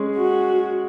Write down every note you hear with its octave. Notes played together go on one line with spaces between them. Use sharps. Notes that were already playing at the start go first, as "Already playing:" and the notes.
Already playing: G#3 C#4 G#4
F#4